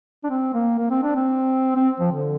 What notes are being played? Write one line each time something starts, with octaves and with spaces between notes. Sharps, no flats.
D4
C4
A#3
A#3
C4
D4
C4
C4
F3
D3